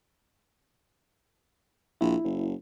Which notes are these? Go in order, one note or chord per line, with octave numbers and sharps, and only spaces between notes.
A#1 E4
F#1